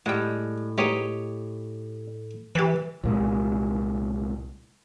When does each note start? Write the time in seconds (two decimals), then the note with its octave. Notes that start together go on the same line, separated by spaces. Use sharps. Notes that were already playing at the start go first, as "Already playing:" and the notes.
0.06 A2 G3 G#3 F#5 G5
0.78 G#3 B3 D#4 G4 C#5 D#5
2.55 E3 G4 B4
3.04 C2 A#2 G#3